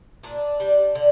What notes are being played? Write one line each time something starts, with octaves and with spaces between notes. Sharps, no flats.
A#2 D4
G3
D3